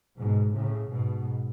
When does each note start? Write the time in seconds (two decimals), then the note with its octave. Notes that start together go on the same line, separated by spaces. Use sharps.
0.18 G#2 B2
0.55 A2 C#3
0.92 G#2 B2